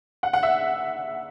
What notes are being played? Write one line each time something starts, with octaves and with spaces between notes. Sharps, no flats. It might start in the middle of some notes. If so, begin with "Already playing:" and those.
F#5
F#5
E5